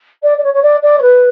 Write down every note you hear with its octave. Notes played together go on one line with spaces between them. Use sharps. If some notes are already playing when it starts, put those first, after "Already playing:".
D5
D5
C#5
C#5
D5
D5
C#5
B4